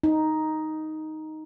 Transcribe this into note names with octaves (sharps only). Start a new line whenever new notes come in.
D#4